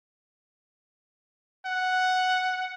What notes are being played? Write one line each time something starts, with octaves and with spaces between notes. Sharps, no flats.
F#5